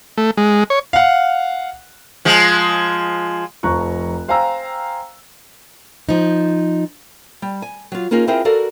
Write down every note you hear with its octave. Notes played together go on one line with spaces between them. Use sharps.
A3
G#3
C#5
F5 F#5
F3 G#3
F1 F3 A#5 C#6 F#6
C5 F5 G5 G#5 A#5 E6
F3 D#4
G3
G#5
F#3 F4
A#3 C#4 D#4 F4 G#4 A#4
C4 E4 F4 G#4 A#4 C5
F#4 A4 A#4 D5 F5